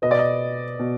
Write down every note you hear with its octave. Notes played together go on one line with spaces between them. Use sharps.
B2 B3 D#5
D5
D#5
B2